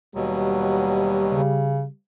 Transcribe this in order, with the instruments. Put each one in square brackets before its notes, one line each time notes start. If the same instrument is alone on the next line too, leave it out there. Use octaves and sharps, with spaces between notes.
[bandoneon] D#2 B2 F#3 [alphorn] G3
[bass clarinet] C#3